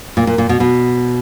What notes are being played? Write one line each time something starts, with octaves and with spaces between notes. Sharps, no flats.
A#2
A#2
A#2
B2
B2